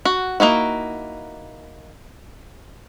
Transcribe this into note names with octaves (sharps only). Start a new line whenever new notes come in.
F#4
A#3 D#4 E4 F#4